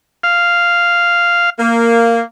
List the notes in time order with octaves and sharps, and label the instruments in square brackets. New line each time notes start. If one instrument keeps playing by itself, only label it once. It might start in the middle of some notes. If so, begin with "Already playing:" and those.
[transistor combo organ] F5
[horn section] A#3